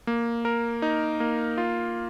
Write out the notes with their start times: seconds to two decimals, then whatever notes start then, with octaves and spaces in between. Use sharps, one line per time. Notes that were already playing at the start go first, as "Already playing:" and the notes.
0.07 A#3
0.45 A#4
0.82 D#4
1.20 A#3
1.58 F4